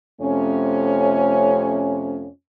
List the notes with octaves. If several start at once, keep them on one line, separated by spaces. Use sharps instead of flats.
F2 C3 A3 C#4